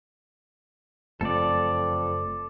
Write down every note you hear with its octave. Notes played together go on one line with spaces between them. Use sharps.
F#1 F2 A3 A4 D5